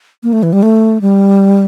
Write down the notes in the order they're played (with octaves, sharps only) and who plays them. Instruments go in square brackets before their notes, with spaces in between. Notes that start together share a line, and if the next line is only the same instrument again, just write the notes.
[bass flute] A#3
A3
E3
G3
A3
G3